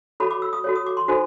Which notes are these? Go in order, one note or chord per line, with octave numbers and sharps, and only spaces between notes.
F#4 A4 C#5 B5
D6
E6
D#6
F#4 A4 C#5
D#6
D6
C6
D#4 F#4 A4 C5